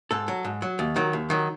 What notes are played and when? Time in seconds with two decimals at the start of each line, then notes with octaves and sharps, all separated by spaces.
0.11 G#2 A4
0.28 F#3
0.45 G#2
0.62 F#3
0.79 D#2
0.96 D#3 F#3
1.13 D#2
1.30 D#3 F#3